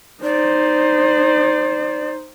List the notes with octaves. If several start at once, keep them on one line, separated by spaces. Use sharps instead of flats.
D#4 C5 D5